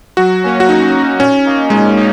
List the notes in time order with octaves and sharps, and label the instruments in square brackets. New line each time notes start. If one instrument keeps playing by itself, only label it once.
[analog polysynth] F#3 [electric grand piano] F#4
[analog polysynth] A#3 C#4
[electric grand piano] F#4
[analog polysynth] F#3 [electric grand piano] D#4
[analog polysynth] A#3 C#4
[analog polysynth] A#2 [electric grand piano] C#4
[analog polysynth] A#3 D#4
[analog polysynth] A#2 [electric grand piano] G#3
[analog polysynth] A#3 D#4